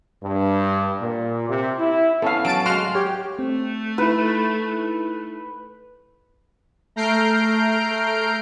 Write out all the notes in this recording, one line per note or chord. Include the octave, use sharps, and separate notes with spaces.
G2
A#2
C3
E4
B3 C#4 A4 F5
F#3 A5 D7
G#3 F#4 F5 C6 F6
G4 C#5
A3 C4
D#4 E4 B4
A3 A#5 F6 G6 C7 D7